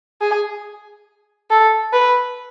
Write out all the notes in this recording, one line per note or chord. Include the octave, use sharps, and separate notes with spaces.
G#4
A4
B4